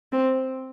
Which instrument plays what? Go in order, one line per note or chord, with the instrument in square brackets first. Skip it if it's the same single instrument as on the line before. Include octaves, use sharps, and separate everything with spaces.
[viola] C4